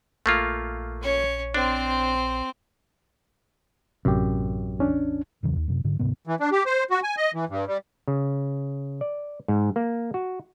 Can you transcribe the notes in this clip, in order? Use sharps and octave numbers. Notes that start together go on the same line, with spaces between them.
A#1 A3 A#3 F4
C#4 C#5
C4 D4 C5
A1 F#2 C3 G4
E2 C#4 D4
D1 E2 C#3 F#3
D#2
F#2 C3
G#2 D3
D2 G#2 C3 B3
E3
D4
G4
C5
F#4
G#5
D#5
E3
G2
G3
C#3
D5
G#2
A#3
F#4